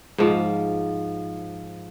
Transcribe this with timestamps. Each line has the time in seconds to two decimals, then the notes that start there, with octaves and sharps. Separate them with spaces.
0.18 G#2 F3